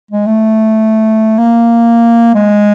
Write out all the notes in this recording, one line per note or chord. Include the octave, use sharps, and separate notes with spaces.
G#3
A3
A#3
G#3